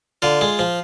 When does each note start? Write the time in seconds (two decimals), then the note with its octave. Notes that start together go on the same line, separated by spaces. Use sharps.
0.22 D3 F4
0.41 G#3
0.59 F3